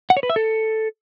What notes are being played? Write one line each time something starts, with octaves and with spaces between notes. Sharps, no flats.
F#5
C#5
B4
E5
A4